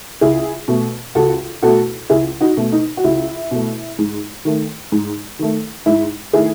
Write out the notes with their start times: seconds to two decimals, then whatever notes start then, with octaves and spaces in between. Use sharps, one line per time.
0.21 C#2 E4 G#4
0.68 B2 A3
1.15 C#2 F#4 A4
1.62 B2 A3 F#4 A4
2.10 C#2 E4 G#4
2.41 D#4 F#4
2.57 B2 A3
2.72 D#4
2.97 F#4
3.04 C#2 E4
3.51 B2 A3
3.99 G#2
4.45 D#3 A3
4.92 G#2
5.39 D#3 A3
5.86 G#2 E4
6.33 D#3 A3 E4 G#4